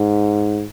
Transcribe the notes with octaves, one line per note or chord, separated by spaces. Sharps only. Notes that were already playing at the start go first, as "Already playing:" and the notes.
Already playing: G#2